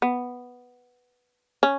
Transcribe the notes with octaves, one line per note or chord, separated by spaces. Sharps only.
B3
C#4